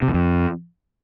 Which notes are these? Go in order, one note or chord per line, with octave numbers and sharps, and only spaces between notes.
C3
E2
F2